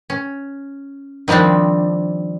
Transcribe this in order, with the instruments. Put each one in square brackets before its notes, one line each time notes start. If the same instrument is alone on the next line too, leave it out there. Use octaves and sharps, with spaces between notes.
[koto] C#4
D#3 F3 G3 C4 D4